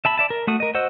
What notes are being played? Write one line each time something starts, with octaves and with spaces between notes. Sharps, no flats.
E5 A5 B5
D5 E5 A5
A#4
A3 F#4 D#6
A#4 D#5
F#4 C5 D#5 F#5 E6